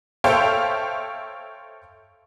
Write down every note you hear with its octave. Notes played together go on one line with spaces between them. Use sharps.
A4 C5 C#5 E5 F5 G5